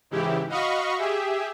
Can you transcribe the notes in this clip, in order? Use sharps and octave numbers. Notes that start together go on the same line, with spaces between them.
G#2 C#3 E3 E4 G4
F#4 D#5 F5 B5 C#6
G4 G#4 E5